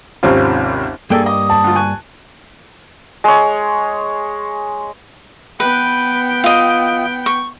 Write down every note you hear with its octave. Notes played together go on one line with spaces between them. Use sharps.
G#1 D#2 C3 C4 C#4 F4
G2 A#3 G#4 A4 G5
D#5 D6 D#6
A5
D2 F4
G#5 C#6 F#6
G#3 C#5
B3 B4 G5
F4 D#5
C#6